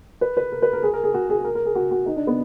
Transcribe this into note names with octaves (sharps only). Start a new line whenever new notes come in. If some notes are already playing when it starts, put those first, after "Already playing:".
B4
B4
A#4
B4
A#4
G#4
A#4
G#4
F#4
G#4
A#4
A#4
G#4
F#4
F#4
D#4
D4
B3